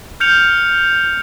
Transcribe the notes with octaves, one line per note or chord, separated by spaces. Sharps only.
F6 G6 C#7 F7